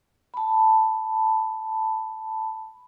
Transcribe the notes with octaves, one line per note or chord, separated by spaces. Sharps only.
A5 B5